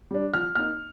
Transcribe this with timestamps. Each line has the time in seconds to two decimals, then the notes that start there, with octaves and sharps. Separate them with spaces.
0.11 G3 D4
0.34 F3 F6
0.55 A#3 D#4 F6